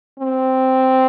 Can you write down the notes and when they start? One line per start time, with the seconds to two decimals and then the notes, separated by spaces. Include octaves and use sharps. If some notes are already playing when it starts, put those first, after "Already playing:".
0.20 C4